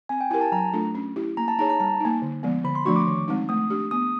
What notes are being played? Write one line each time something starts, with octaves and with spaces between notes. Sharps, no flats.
C4 G#5
G5
E4 G4 A#4 G#5
A5
F#3 A#5
A3 D4 F4 A4
C#4
E4 G4
A#3 A#5
A5
D#4 G#4 C#5 A#5
A#5
G3 A5
A#3 D#4
D3
F3 G#3 B3
D3 B5
C6
F3 A3 D4 F#4 C#6
D6
D#3
G#3 C4 D#4
A3 D#6
D4 G4
B3 D#6